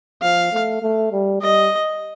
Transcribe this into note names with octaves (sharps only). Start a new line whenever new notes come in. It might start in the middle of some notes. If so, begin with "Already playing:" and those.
F3 F5
A3
A3
G3
G3 D#5